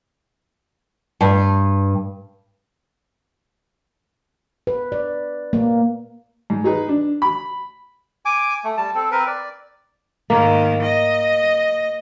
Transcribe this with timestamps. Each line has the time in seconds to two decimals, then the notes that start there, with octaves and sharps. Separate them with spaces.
1.21 G2
4.67 B4
4.92 D5
5.53 A#3
6.50 G#2
6.64 D#4 G#4 B4
6.88 D4
7.22 B5
8.25 G#5 D6
8.64 A3
8.77 G3 A5
8.95 C4 A4
9.12 C4 A#4 B4
9.27 D5
10.30 G#2 D#3 A#3
10.82 D#5